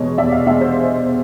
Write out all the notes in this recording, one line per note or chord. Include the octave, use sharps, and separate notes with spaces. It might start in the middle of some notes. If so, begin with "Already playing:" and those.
Already playing: E2 B2 G#3 C#5 D#5
E2 D5 E5
D#5 F5
B2 G#3 E5 F#5
C5 D5